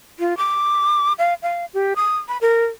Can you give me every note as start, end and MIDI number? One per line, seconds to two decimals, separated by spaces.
0.20 0.37 65
0.37 1.13 86
1.19 1.34 77
1.42 1.65 77
1.74 1.93 67
1.96 2.17 87
2.28 2.37 83
2.41 2.65 70